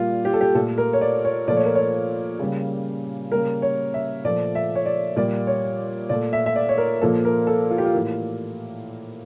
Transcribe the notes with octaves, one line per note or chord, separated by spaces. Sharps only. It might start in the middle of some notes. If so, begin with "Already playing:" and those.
Already playing: A#2 G3 A#3 F4
G4
A4
G4
A#2 A3 A4
A#4
C#5
D5
C#5
A#2 F3 A3 D5
C#5
A#4
C#5
C#3 G3 A#3
C#3 G3 A#3 A#4
C#5
E5
A#2 F3 A3 D5
E5
C#5
D5
A#2 G3 A#3 D5
C#5
A#2 A3 D5
E5
E5
D5
C#5
A#4
A#2 F3 A#3 A4
A#4
A4
F4
G4
F4
A2 E3 A#3